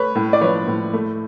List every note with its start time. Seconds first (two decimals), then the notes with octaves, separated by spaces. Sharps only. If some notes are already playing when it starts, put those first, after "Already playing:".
Already playing: A3 B4 C#5
0.15 A2
0.33 D5
0.41 F3 B4 C#5
0.67 A2
0.93 A3